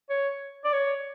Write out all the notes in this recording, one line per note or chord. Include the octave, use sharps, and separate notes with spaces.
C#5
D5
C#5